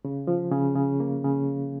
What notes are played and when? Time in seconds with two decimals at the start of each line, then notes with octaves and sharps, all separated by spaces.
0.05 C#3
0.27 F3
0.51 C#3
0.75 C#3
1.00 A#3
1.24 C#3